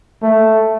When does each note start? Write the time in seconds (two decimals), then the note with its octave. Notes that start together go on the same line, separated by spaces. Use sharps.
0.22 A3